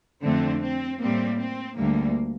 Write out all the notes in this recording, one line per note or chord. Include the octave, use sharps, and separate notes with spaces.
F2 D3 A3 C4
C4
A2 G3 A#3 C4
C4
D2 D3 G3 A#3